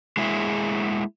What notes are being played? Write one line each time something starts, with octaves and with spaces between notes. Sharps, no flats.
G#3 A#3 E4 G#4